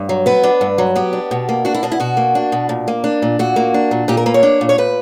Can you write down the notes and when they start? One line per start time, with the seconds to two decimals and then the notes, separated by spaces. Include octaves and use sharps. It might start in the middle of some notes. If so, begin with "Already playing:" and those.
Already playing: G2
0.09 F#3
0.26 B3 B4
0.44 D4
0.61 G2
0.78 F#3
0.95 B3 G4
1.13 D4
1.31 B2
1.49 A#3
1.65 D4 F#4
1.75 E4
1.83 B2 D4
1.92 E4
2.00 B2 F#4
2.17 A#3
2.35 D4
2.52 B2
2.69 A#2
2.88 A#3
3.04 D4
3.22 A#2
3.39 A#2 F#4
3.56 A#3
3.74 D4
3.91 A#2
4.08 A#2 G4
4.17 A#4
4.26 A#3 B4
4.34 C#5
4.43 D4
4.61 A#2
4.69 C#5
4.78 A#2 B4